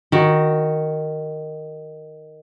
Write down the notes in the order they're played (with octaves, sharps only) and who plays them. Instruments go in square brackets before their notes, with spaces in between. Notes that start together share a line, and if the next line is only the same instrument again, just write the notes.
[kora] D#3 F#4